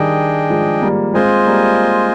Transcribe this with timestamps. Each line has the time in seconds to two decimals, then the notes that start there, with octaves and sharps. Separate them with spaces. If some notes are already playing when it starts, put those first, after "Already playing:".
Already playing: D#3 G3 D4 G#4 D#5 G5
0.50 F3 G#3
0.82 G3 A#3
1.14 G#3 C4 F4 C5 D#5 G#5
1.46 G3 A#3